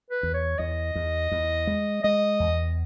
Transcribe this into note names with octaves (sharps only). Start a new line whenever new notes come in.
B4
E2
C#5
E2 D#5
E2
E2
G#3
G#3 D#5
E2